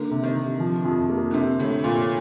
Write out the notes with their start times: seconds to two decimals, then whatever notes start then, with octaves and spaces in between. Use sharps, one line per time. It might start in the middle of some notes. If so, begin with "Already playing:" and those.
Already playing: D3 A#3
0.11 C3
0.23 D#3
0.36 C3
0.60 F3
0.85 F2
1.10 A#3
1.31 D3
1.34 C3 C4
1.59 A2 D3
1.84 A#2 F4